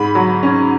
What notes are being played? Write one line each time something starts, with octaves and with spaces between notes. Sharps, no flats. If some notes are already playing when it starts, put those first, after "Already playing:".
Already playing: G#2 B5
F#3
C#4